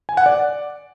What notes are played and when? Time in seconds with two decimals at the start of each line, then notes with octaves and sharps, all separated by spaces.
0.09 G#5
0.17 F#5
0.26 D5